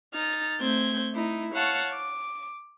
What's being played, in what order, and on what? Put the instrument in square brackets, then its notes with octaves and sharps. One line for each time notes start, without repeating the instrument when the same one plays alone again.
[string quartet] D#4 F6 A6
A3 C4 G6 G#6
A3 D#4 E4
C#5 F5 F#5 A5 C#6
D6